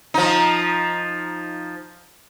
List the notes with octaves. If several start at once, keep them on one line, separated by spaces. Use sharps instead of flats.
F3 D#4